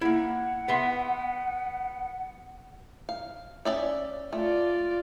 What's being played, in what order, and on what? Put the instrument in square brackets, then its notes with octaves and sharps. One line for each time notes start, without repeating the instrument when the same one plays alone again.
[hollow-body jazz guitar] A#3 E4 [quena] F#5
[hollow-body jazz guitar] B3 E5 C6
[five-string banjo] F5
C#4 D5 E5
[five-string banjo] A3 [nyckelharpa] F4 D5